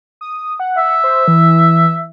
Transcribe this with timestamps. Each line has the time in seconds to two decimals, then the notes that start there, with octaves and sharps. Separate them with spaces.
0.21 D#6
0.60 F#5
0.77 E5
1.04 C5
1.28 E3